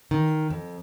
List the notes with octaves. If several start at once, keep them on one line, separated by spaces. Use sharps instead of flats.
D#3
F2